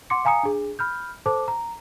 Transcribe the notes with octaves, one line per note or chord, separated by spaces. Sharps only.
F#5 C6 D6 C#7
F5 G#5 A#5 D#6 C#7
D4 G#4
B5 F6 G6
A4 C5 A5 D6
A#5